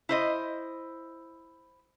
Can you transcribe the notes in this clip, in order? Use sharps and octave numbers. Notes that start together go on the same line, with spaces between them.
E4 C5 D#5